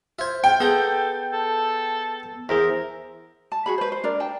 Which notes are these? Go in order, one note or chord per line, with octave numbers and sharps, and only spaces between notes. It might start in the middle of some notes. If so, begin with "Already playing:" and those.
F4 C5 E5 G#6
F4 G5
B3 G#4 A4 A#5 G6
A4
E2 G#4 A#4 C5 E5
A5
F#4 G#4 B5
B4 C5
C5
D4 A#4 D5
G5 A5